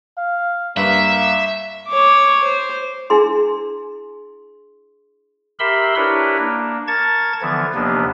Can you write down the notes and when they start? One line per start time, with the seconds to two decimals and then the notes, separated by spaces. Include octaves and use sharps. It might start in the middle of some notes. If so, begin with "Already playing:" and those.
0.17 F5
0.77 G2 A#3 B4 E5
1.88 C#5 D6
2.44 C5
3.10 D4 E4 G#4 C6
5.60 G4 A#4 E5 B5 C6 E6
5.96 D4 E4 G4 A#4 B4 C#5
6.38 A#3 D4
6.88 A#4 A5 C#6 G#6 A6
7.42 D3 E3 F3 B3
7.75 D#2 C3 F3 A#3 B3 D4